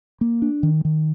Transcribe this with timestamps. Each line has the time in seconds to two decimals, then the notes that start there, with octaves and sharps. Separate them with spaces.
0.21 A#3
0.42 D4
0.63 D#3
0.85 D#3